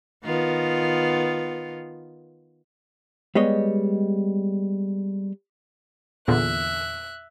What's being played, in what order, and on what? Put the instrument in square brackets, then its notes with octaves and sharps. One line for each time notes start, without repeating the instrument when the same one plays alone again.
[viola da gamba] D#3 B3 F4
[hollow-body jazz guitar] G3 G#3 B3 C#5 D#5
[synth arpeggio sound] E2 A#2 D3 [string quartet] E5 F#6